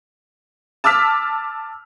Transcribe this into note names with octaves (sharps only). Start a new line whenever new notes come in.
A5 D6 E6 F6 B6